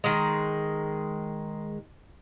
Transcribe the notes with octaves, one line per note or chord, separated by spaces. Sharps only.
D#3 G#3